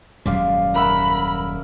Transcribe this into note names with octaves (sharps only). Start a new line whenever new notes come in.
D#1 F#2 G3 G#3 D5 F5
A#4 E5 F#5 B5